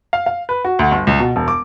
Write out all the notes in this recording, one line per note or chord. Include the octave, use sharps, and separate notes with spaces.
F5
F5
B4
F#4
D2
G1
C#2
B2
E1
D6